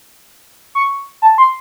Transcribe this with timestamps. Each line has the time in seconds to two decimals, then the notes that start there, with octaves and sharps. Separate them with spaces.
0.75 C#6
1.22 A5
1.38 C6